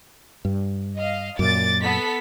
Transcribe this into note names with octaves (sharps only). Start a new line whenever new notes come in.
G2
D#5 F5
F#2 A#2 D6 A6
B3 A4 B6